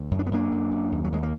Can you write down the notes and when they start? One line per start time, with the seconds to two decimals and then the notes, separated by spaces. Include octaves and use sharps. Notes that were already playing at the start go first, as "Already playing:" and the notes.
Already playing: D2
0.11 F#2
0.19 D4
0.26 B3
0.31 F#2 A#3 D4
0.52 F#2
0.71 F#2
0.92 D#2
1.04 F#3
1.12 D#2 G#3
1.23 A#3